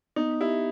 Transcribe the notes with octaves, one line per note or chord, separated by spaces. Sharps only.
B3 D#4
E4 G4